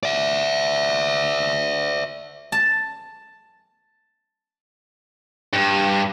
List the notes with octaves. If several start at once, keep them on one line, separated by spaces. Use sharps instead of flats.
D5 E5
A5
G2